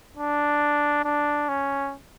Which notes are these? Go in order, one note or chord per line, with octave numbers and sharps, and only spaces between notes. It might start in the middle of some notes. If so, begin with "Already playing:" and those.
D4
D4
C#4